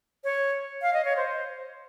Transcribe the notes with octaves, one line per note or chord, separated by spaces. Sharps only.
C#5
F5
D#5
C#5
C5